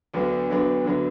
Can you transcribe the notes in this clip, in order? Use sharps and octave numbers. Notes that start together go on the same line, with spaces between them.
D2 D3 F#3 B3 D4
D2 D3 F#3 B3 D4
D2 D3 F#3 B3 D4